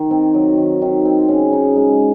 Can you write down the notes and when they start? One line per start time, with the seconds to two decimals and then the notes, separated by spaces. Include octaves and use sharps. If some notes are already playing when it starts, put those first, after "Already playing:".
Already playing: D#3
0.11 C4
0.34 F#3
0.58 D#3
0.82 D#3
1.05 C4
1.29 C#3
1.53 D#4
1.76 G#3